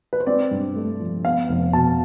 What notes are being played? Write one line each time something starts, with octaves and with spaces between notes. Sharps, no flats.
B4
C5
C4 D5
G2
A3
F3
B3 F5
F1
B2 A5